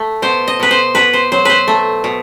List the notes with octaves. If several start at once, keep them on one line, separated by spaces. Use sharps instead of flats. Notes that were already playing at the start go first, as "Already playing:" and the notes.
Already playing: A3
B2 C5
D#5
B2 B4
C5
B2 B4
C5
F#3 C5
B4 C5
A3
B2